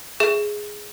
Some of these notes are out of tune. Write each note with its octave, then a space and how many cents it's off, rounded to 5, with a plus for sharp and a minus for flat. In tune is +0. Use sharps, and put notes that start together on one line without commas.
G#4 +0 E5 +0